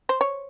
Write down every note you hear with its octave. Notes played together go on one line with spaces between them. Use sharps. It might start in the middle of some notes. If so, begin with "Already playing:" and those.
C5
C#5